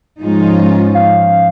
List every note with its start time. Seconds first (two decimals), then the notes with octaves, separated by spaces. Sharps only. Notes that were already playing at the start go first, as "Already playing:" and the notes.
0.20 G#2 F3 G#3 C#4 D#4 F4
0.95 F5